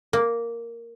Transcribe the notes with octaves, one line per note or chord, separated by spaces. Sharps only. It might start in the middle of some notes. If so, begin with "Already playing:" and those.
A#3